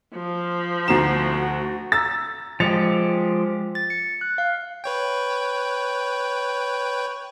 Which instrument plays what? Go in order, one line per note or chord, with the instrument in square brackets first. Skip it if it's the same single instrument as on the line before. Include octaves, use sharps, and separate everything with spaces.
[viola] F3
[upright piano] D2 E7 [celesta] D#4 A#5 C7 [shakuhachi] F#4
[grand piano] A#5 E6 A6
[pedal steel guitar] F3 G#3 G4 [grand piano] A6 C#7 F7
[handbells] A6
C#7
F#6
F5
[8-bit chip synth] B4 C#5 G5